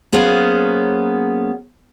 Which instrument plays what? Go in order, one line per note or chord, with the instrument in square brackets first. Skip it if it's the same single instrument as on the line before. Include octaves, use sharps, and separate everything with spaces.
[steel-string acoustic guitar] F#3 A#3 B3 C#4 G#4 C5